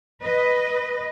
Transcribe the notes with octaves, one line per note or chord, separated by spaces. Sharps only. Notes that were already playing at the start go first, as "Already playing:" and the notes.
B4 D#5